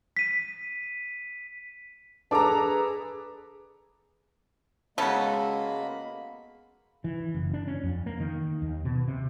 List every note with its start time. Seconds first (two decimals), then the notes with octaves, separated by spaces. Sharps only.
0.17 B6 D#7
2.31 D4 G#4 A4 B4 A5 A#5 D6
4.98 C#3 G#3 A#3 B3 F#4 A4 B5
7.04 E3
7.34 F#1
7.53 D4
7.67 C#4
7.83 F2
8.06 A#3
8.20 D#3
8.62 D#2
8.85 B2
9.08 C3